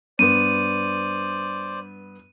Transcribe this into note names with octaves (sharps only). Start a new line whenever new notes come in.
G2 B3 C5 D5 D#7